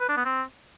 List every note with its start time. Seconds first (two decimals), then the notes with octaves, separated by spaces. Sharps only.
0.01 B4
0.09 D4
0.17 B3
0.25 C4